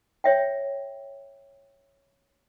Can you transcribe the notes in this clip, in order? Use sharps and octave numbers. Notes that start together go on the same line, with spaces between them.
C#5 E5 G5